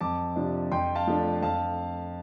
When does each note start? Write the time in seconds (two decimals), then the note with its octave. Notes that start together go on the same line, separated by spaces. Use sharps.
0.01 F2 A5 D6
0.36 C3 F3 D4
0.71 F2 G5 C6
0.95 F5 A5
1.07 F3 A3 D4
1.42 F2 F5 A5